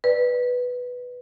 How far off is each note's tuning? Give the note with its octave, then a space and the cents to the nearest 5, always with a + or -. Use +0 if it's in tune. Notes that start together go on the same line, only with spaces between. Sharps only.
B4 +0 D5 +20